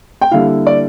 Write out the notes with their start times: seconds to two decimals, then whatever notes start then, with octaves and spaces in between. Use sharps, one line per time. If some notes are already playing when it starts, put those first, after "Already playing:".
0.21 G5
0.31 D3 G3 A#3 E4 F5
0.67 D5